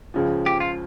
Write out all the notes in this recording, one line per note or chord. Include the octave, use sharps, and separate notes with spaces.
C#2 C#3 F3
G4
F4